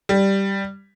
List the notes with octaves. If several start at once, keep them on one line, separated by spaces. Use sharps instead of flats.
G3